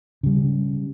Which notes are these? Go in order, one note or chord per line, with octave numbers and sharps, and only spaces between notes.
C#3 G3